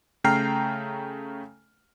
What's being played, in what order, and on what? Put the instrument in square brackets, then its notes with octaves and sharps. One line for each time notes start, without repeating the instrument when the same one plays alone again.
[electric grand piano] C#3 A3 G5 A#5 F6 C7